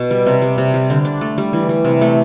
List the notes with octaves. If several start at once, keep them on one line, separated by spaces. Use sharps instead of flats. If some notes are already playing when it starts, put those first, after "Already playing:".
Already playing: B2
G3
C3
G3
C3
G3
D3
D4
A3
G3
E3
G3
C3
A3